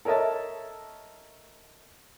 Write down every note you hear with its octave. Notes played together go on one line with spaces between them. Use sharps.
A4 A#4 C#5 D#5 E5 A5